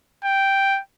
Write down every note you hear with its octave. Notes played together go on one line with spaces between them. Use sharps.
G5